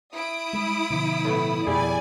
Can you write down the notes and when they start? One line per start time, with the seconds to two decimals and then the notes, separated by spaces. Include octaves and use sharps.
0.12 E4 D#6 D7
0.53 G3 G#3
0.90 B2 D3 F3
1.25 A2 A3 B3
1.67 F2 B2 F3 G3 E4 G#4 D5 G#5